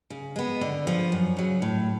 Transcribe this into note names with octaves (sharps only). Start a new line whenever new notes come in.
C#3
G#3 B3
D3
F3 B3
F#2
C#3 F#3
A2